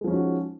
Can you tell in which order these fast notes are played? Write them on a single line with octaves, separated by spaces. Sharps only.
G#3 F3 C#4 D#4 F#4